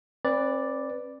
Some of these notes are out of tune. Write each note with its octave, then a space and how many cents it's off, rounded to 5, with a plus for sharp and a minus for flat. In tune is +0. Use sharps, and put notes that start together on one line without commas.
C4 +40 B4 +0 D5 +0